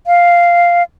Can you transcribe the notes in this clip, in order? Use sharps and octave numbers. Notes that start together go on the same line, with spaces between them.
F5